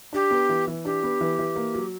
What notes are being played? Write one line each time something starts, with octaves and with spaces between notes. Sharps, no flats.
D4 G4
B3
E3
E3
D4 G4
B3
E3
E3
A#3
F#3